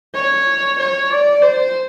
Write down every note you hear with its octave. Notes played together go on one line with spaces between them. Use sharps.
C#5
C#5
D5
C5